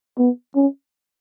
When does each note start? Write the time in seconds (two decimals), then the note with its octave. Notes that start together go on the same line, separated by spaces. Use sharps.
0.18 B3
0.56 C#4